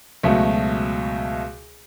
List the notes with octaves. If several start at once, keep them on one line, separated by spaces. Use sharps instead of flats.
C#2 B2 F#3 A3